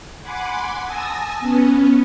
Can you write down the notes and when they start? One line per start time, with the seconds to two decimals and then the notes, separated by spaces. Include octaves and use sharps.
0.22 F#5 G#5 B5 C6 D6
0.84 G#5 A5 D#6 E6 A#6
1.40 B3 C#4